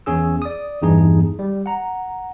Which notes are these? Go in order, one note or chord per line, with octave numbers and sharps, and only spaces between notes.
E2 C#4 G#4 E6
D5 D#6
E2 G2 E3 D#4 G#4
G3
F#5 A#5